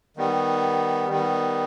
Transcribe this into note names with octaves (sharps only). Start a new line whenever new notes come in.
D#3 G3 B3
D#3 G3 B3